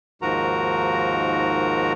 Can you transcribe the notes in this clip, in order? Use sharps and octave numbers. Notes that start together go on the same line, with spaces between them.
D#2 G#2 F3 F#4 A#4 A#5